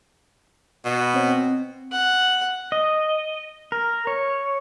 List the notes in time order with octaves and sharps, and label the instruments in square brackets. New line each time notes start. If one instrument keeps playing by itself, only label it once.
[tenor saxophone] B2
[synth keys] B5
C4 C#5
C4
[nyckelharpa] F#5
[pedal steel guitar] D#5
A#4
C#5